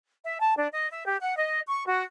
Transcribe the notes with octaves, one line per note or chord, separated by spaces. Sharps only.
E5
A5
D4
D#5
E5
G4
F#5
D#5
C#6
F#4